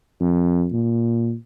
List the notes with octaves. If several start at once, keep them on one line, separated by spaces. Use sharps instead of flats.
F2
A#2